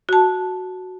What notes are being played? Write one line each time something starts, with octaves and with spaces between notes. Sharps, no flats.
F#4 A5